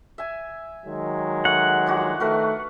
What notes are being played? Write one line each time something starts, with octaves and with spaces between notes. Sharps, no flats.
E5 G#5
D#3 F#3 G#3
A3 F#5
F3 D4 F#4
D#3 A3 F#4 B4 F5